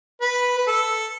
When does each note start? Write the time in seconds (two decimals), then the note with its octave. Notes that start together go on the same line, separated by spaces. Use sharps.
0.21 B4
0.58 B4
0.68 A4